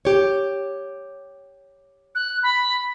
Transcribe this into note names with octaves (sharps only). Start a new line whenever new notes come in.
G4 C#5
F#6
B5